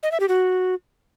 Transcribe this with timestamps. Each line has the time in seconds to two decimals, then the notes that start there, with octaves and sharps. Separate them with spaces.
0.03 D#5
0.12 E5
0.20 G4
0.29 F#4